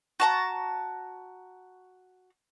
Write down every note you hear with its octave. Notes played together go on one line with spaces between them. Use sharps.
F#4 A5 A#5